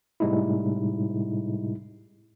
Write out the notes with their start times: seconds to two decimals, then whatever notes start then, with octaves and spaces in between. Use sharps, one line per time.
0.20 A2 C3 G3 G#3 D#4 E4